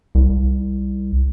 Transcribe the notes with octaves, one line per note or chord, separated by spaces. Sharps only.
C2